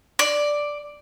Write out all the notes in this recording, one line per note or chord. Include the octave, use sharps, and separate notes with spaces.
D5